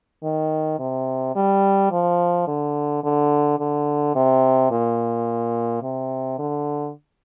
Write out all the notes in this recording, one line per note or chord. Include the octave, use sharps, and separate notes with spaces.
D#3
C3
G3
F3
D3
D3
D3
C3
A#2
C3
D3